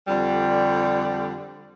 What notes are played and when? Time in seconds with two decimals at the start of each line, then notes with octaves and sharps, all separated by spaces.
0.08 F2 D3 G3